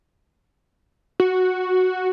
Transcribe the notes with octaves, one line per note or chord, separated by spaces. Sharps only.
F#4